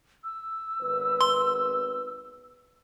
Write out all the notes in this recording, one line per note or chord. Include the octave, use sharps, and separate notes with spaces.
E6
G#1 B3 B4
C6